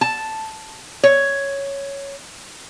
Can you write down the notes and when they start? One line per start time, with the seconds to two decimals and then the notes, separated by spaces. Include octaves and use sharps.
0.01 A5
1.03 C#5